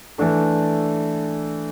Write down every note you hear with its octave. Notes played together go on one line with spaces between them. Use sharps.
E3 A3 D4 A4